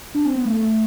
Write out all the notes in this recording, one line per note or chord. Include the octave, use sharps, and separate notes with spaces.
D4
C4
B3
A3